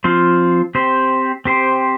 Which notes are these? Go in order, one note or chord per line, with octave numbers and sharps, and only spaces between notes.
F3 C4 F4 C5
C4 G4 C5
C4 G4 C5